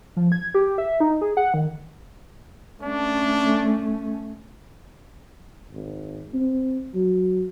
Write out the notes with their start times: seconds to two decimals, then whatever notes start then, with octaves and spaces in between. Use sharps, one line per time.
0.16 F3
0.32 G#6
0.54 G4
0.78 E5
1.00 D#4
1.21 G#4
1.37 F#5
1.54 D#3
2.83 A3 C#4 D4
5.71 G#1
6.33 C4
6.94 F#3